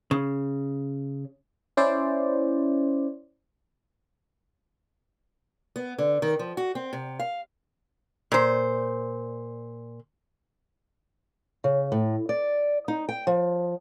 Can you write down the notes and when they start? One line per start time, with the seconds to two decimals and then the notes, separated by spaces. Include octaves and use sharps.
0.11 C#3
1.77 C#4 E4 C5 D5
5.76 B3
5.98 D3
6.22 D#3
6.39 F3
6.57 F#4
6.75 C4
6.93 C3
7.20 F5
8.32 A#2 C5
11.64 C#3
11.92 A2
12.29 D5
12.88 D#4
13.09 G5
13.27 F3